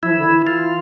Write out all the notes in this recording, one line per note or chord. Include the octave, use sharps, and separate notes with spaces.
F3 E4
E3
D3
E3
F4